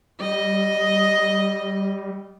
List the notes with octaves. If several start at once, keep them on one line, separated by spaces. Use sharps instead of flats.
G3 D#5